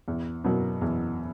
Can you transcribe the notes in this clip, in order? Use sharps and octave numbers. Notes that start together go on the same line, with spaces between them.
E2
B2 F#3 A#3
E2